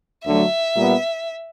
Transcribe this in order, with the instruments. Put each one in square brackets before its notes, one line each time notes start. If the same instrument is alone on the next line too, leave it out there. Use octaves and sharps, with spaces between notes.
[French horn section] D2 D3 F#3 A3 [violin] E5
[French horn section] A#2 G3 B3